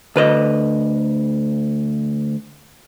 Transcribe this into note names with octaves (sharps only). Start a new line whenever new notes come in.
D2 B4 D#5